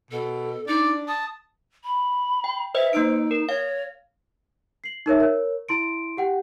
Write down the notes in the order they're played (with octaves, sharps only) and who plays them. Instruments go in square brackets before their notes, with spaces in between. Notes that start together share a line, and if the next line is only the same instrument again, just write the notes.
[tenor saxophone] B2 [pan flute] A4
[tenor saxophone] D4 [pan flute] D#4 [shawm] D5
[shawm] A5 [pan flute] D#6
[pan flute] B5
[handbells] G5
[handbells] B4 C5 D#5 [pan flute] E5
[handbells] A#3 E6 D7 [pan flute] D#4
[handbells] A#4
[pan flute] C#5 [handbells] F5
[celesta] C7 F#7
D#4 A#4 C#5 E5
A#4 C#5
E4 C6 D7
G4 F#5 G5